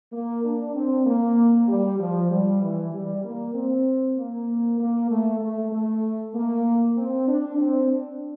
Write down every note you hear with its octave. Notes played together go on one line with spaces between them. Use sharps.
A#3
D4
C4
A#3
G3
F3
G3
E3
G3
A#3
C4
A#3
A#3
A3
A3
A3
A#3
C4
D4
C4
D4